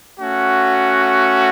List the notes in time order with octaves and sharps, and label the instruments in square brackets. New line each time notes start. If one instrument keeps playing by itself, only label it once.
[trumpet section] A3 C#4 F#4